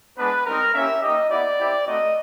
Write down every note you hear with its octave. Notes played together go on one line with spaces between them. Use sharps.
G#3 B3 D4 B4
G3 C4 D#4 A#4
A#3 C#4 E4 G4 E5
A#3 D#4 G4 D#5
B3 E4 G4 D5
C4 E4 G4
A3 C4 D#4 F#4 D#5